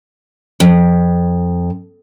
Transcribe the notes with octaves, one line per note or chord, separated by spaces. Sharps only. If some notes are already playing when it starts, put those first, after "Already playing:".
F2